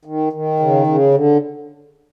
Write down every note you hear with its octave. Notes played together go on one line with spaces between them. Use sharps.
D#3
D#3
C#3
C#3
D3